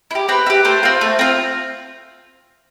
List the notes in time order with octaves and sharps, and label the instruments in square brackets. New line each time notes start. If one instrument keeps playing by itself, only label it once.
[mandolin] E4
G4
C4 B4
E4
G4
A3 C5
C4 F4
A3
C4 F4